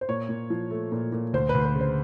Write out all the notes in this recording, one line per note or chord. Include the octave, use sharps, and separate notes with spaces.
C5
A#2 C#5
A#2
F3
A3
A#2
A#2
D2 C5
B4
D2
B4
C#3
C5